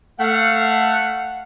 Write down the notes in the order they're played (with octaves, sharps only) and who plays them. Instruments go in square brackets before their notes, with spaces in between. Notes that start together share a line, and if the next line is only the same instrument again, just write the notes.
[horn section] A3 F5 F#5